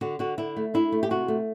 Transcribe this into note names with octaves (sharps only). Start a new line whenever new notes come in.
D3 F#4
D3 F#4
D3 E4
A3
D4 E4
A3
G4
C3 F#4
A3